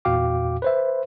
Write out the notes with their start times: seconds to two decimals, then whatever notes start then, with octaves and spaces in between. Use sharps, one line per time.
0.05 E2 A#2 F#4 F5 G5 D6
0.62 B4 C5 E5